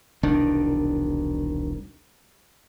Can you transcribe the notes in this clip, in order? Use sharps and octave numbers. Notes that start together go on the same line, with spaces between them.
E1 C2 D#3 D4